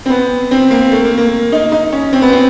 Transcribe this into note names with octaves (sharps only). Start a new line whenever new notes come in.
C4
B3
C4
A#3
A3
A#3
A#3
D#4
D#4
C#4
C4
B3
C4